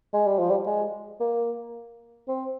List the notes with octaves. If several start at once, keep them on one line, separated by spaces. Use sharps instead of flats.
G#3
G3
F3
G3
G#3
A#3
C4